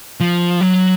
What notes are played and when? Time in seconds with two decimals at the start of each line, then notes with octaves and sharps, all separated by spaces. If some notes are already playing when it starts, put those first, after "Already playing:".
0.20 F3
0.61 F#3